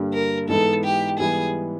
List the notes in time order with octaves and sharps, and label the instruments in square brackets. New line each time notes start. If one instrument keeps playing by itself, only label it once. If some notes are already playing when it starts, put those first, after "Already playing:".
Already playing: [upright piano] G2 D3 G3 A#3
[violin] A#4
[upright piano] G#2 E3 G#3 B3 D#4 [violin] A4
[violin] G4
[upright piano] G#2 E3 G3 B3 [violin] G#4